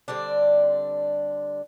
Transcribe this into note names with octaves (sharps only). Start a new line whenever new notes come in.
D3 G3 C4 D4